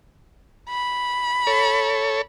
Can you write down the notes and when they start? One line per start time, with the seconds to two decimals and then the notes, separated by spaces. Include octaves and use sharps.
0.70 B5
1.47 A4 C#5